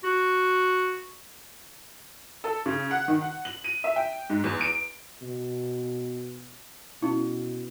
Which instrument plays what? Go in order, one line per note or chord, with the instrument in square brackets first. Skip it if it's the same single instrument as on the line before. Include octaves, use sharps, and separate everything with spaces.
[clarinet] F#4
[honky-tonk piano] A4
C#3
F#5
D#3
F#5
F#7
D#7
E5
G5
G#2
E2
D7
[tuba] B2
[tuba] B2 [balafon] C#4 E4